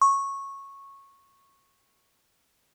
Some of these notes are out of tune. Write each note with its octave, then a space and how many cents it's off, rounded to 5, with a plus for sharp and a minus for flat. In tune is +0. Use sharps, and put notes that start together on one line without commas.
C#6 -10